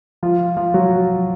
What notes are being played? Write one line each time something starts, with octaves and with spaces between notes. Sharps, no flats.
F3 F4
F3 F4
F#3 F#4